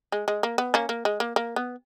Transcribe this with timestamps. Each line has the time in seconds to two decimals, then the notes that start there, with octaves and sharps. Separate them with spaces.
0.12 G#3
0.28 G#3
0.43 A#3
0.58 B3
0.74 A#3 C#4
0.89 A#3
1.05 G#3
1.20 A#3
1.36 A#3
1.56 B3